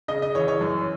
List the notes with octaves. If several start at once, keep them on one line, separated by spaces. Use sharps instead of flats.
C#3 D#5
D#5
E3 C#5
C#5
F#2